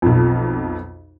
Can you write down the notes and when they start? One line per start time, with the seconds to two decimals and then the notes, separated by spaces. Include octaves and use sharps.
0.02 B1 F2